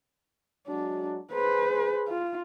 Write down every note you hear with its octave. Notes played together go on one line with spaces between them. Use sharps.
F#3 G#3 D4 F#4
G#4 B4 C5
F4